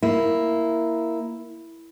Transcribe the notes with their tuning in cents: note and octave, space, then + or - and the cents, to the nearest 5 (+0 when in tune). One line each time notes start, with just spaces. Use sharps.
A#3 +0 E4 +0